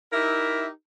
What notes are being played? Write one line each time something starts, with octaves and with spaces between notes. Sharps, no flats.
D#4 E4 G4 A#4 E5